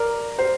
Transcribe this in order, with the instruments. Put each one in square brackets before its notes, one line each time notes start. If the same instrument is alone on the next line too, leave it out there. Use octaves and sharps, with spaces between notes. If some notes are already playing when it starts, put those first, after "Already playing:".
Already playing: [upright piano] A#4 D5
C5